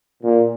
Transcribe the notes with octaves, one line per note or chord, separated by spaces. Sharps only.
A#2